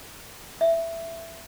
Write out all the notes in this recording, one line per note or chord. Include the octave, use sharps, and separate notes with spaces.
E5